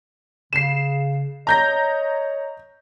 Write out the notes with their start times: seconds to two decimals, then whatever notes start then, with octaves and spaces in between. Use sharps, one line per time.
0.53 C#3 C7 E7
1.47 C#5 D#5 A#5 G6 A#6